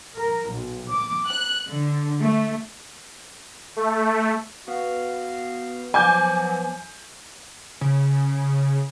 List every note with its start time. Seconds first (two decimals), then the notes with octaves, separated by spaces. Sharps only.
0.17 A#4
0.50 B1
0.90 D6
1.28 F#6
1.70 D3
2.22 A3
3.76 A3
4.68 B3 F#4 F5
5.94 F3 F#3 G#5 D6 G6
7.81 C#3